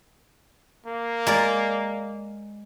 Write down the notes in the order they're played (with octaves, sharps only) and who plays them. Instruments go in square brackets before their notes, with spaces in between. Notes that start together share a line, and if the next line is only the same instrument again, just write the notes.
[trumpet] A#3
[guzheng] G#3 A#4 D5